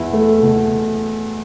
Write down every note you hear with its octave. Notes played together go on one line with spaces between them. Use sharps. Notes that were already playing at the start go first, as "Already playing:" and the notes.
Already playing: E2 B2 E4
A3
B2